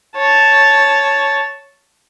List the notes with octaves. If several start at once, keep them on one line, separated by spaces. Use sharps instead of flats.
C#5 A5